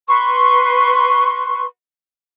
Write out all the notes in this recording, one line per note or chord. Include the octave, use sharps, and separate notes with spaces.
B4 C6 C#6